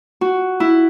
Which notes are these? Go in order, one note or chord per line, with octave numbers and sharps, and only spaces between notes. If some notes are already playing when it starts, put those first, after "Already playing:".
F#4
E4